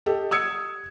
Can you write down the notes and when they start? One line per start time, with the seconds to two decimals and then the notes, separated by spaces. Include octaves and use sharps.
0.06 G4 A4 D#5
0.31 D#6 E6 G#6 C#7